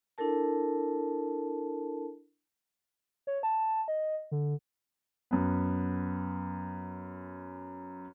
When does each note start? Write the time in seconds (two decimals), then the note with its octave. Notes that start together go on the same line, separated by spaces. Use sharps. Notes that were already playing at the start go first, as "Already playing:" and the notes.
0.18 D4 E4 A4 A#4 A5
3.27 C#5
3.43 A5
3.88 D#5
4.32 D3
5.31 F#2 B3